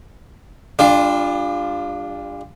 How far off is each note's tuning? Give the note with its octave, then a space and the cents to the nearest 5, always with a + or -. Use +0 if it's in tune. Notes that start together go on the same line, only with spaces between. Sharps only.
G3 +40 D4 +0 F4 +0